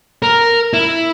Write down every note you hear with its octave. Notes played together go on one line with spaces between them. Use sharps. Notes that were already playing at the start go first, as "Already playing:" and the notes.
A#4
E4